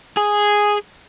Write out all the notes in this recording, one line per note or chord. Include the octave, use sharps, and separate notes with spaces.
G#4